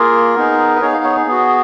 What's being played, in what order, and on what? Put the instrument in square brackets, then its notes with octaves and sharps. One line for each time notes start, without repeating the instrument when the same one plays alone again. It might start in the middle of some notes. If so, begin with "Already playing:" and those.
Already playing: [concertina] A#3 F4 G#4 A#4
B3 D#4 G#4
B4
B3 D#4 G#4 C#5
F5
C#5
G#4
B3 F#4